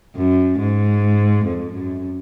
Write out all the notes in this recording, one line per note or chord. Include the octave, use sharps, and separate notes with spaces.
F#2
G#2
F2
F#2